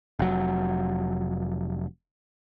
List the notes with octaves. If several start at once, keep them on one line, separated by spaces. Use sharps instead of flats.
F1 F#3